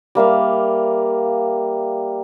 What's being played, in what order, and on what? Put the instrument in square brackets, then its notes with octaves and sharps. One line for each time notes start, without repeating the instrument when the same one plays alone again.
[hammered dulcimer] G3 A#3 E5 F5